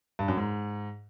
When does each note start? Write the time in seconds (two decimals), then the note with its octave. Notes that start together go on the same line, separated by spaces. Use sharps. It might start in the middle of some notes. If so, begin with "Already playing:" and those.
0.19 G2
0.28 F#2
0.37 G#2